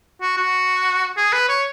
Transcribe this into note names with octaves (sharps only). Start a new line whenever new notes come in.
F#4
F#4
G#4
B4
C#5